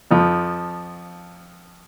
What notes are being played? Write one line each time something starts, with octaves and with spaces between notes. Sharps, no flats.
F2 F3